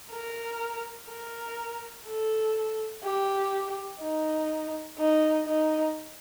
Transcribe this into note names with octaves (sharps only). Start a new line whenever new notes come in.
A#4
A#4
A4
G4
D#4
D#4
D#4